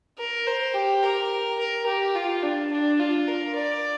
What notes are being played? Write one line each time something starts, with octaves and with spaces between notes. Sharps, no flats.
A#4
C5
G4
A#4
A#4
G4
F4
D4
D4
F4
A#4
D5